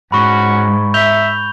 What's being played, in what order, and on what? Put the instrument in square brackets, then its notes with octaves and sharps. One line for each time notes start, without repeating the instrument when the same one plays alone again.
[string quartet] G#2 [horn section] C#4 F#4 [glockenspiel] B5 C#6
[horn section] E5 [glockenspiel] G6 F7 G7